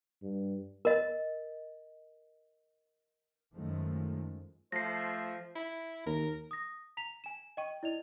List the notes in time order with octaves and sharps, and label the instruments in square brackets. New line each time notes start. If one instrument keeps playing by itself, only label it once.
[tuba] G2
[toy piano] A#4 D#5
[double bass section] F#2 D#3 F3 G#3 A3
[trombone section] F3 A3 C5 [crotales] A#6 C7
[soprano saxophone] E4
[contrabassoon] D#2 [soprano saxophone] A#4
[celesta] D#6 A#6
A#5 B6 F7
G#5 E7
D#5 G5 C#6 D#7
E4 D5 D#5 F7